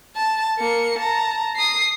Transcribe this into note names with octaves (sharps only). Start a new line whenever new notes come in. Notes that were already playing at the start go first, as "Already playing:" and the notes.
A5
A#3 C#7
A5 A#5
D#6 C7